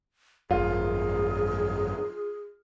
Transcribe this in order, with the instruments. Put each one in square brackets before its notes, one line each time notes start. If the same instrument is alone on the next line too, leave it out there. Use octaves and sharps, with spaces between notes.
[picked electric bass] G#1 F#2 [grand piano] F4 [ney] G#4